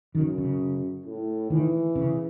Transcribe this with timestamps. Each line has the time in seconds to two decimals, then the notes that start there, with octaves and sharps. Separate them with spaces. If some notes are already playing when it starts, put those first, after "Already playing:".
0.15 F#2 D#3
0.38 C#3
1.05 A2
1.50 D#3 E3
1.95 C#3